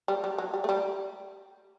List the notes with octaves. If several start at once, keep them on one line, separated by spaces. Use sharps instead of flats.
G3
G3
F#3
G3
A3
G3